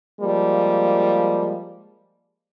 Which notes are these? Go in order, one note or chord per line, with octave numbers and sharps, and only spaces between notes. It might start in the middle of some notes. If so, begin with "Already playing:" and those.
F3 G3 G#3 A#3